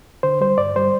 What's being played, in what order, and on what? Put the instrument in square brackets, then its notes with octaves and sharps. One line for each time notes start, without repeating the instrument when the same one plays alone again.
[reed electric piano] D3 C5
G3 C5
G2 D5
G3 C5